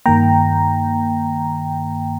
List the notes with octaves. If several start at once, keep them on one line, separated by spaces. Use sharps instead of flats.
G2 D#3 A#3 G5 A#5